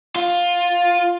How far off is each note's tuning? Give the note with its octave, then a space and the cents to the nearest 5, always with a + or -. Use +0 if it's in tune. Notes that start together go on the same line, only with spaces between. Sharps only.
F4 +10